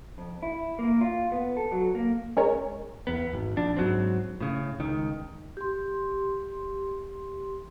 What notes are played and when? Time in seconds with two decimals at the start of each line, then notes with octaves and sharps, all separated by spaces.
0.18 F2
0.43 E4
0.79 A#3
1.01 F4
1.32 B3
1.57 A4
1.72 F#3
1.95 A#3
2.37 G#3 C#4 A#4 C#5
3.07 E2 B3
3.33 G#1
3.56 A#1 D4
3.76 G#2 F#3 C4
4.40 A2 C#3
4.80 C#2 D#3
5.57 G4 C6